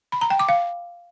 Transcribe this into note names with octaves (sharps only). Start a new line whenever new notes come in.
B5
A#5
G5
D6
F5